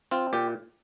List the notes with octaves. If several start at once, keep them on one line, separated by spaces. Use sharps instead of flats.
C4 F4
A#2 G4